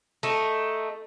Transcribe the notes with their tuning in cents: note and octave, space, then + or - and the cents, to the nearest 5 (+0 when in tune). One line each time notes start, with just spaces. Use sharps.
A3 +0 D#4 +0